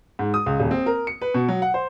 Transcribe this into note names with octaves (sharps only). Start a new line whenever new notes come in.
G#2
D#6
C#2
D#1
C4
A#4
C#7
B4
B2
F#3
F#5
C5